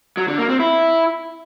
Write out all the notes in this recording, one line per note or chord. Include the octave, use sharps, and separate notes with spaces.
F#3
D3
A#3
C4
E4